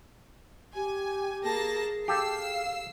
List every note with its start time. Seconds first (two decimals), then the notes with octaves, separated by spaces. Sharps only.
0.75 G4 G#5
1.43 A#3 G#4 A5 A#6
2.08 G4 A4 F5 E6 C7